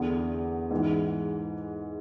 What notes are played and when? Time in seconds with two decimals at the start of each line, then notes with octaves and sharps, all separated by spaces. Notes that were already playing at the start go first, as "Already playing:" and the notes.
Already playing: E2 D3
0.71 G#2 E3